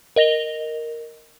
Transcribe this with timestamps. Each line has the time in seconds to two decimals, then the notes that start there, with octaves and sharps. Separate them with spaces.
0.16 A#4 D#5 A#6 F7 G7